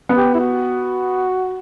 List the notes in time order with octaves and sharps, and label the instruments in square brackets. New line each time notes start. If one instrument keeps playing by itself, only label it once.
[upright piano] B3
[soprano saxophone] G4
E4
F#4